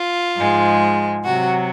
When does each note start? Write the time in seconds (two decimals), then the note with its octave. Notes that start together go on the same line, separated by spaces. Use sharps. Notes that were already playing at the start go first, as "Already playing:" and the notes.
Already playing: F4
0.36 G#2 F3 G#3
1.25 C3 F#3 F#4